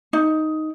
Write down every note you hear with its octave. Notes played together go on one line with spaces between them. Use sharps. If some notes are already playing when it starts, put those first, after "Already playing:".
D#4